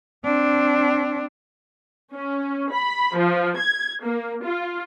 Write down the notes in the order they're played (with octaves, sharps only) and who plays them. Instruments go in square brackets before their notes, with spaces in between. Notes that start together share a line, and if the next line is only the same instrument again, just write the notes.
[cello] C4 D4
[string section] C#4
B5
F3
G#6
A#3
F4